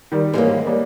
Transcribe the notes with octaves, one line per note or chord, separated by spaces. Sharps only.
D#3 G3
G#2 E3 G3 G#3 A#3 C#4
G3 A#3